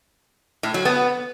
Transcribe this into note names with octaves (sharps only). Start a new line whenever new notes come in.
A2
F#3
B3